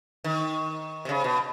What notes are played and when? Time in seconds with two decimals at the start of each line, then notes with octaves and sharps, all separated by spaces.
0.24 D#3
1.05 C3
1.09 C#3
1.24 B2